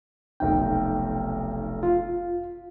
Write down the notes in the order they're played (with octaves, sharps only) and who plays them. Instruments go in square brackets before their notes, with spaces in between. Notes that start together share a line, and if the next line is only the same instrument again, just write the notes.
[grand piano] F1 B1 D#3 [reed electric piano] G5
[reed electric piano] F4